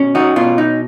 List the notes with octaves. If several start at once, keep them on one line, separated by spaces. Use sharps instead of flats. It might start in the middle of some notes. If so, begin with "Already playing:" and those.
Already playing: B2 C#4
D#4 F#4
B2 F4
D#4